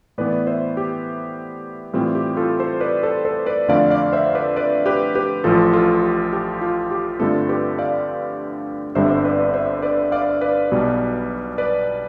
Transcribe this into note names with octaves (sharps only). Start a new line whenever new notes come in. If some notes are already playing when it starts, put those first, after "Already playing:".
A2 E3 B3 B4 D5
C5 E5
G4
A2 E3 G3 C4 F4
G4
F4 A4
A4 C5
B4 D5
A4 C5
A4 C5
B4 D5
F2 D3 A3 D5 F5
D5 F5
C5 E5
B4 D5
B4 D5
G4 B4
G4 B4
A1 A2 F3 F4 A4
F4 A4
G4
G4
F4
G4
G2 D3 A3 C4 F4 A4
G4 B4
D5 F5
G1 G2 D3 G3 C4 C5 E5
B4 D5
C5 E5
B4 D5
D5 F5
B4 D5
B1 B2 G3
B4 D5